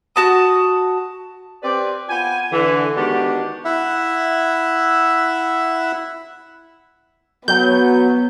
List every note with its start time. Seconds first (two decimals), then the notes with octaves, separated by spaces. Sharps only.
0.16 F#4 A5 D#6
1.63 C4 G4 B4 D5
2.09 B3 F4 G5 G#5
2.52 D3 E3
2.96 D#3 G#3 B3 D4 F#4 G4
3.65 E4 E5 F#5
7.48 F#3 B3 G6